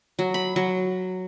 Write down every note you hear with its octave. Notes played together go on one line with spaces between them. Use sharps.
F#3
B5
F#3